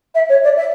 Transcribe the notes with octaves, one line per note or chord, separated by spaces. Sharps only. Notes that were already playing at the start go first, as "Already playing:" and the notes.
E5
C#5
D5
E5